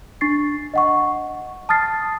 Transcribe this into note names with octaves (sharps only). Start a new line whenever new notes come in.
D4 C#6 A6 C7
D#5 F#5 C#6
A5 D#6 F6 A6 C7